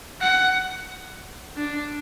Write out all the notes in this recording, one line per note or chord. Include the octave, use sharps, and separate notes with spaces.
F#5
D4